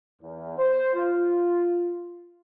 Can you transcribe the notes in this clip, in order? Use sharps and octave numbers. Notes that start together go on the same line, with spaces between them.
E2
C5
F4